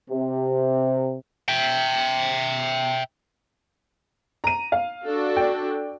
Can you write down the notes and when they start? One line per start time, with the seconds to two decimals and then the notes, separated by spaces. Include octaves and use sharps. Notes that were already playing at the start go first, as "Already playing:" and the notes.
0.10 C3
1.49 E5 G5
4.44 A#5 D#7
4.72 F5
5.05 D4 F#4 A4
5.36 D5 G5